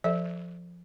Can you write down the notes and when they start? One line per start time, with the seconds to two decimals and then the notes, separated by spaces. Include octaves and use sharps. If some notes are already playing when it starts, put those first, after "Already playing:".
0.04 F3 A4 C5 E5